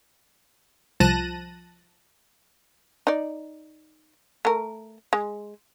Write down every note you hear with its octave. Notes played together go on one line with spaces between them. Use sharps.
C2 F3 A5 F#6 A#6 D#7
D#4 D5
A3 A#4
G#3